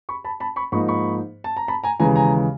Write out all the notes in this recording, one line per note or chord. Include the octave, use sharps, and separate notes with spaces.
B5 C#6
A5 B5
A5 B5
B5 C#6
G#2 F3 A#3 D#4 B5 C#6
B5 C#6
A5
A#5
A5 B5
G#5 A#5
D#2 C#3 E3 G#3 G#5 A#5
G#5 A#5